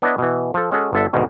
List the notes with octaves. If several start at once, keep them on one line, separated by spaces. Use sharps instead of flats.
B3 D4 E4 B4 C#5 D#5
B2 E3
F3 A4
G#3 C#4 F#4 G#4 A4
G1 D3 A4 E5 A5
D2 G#2 B2 D#3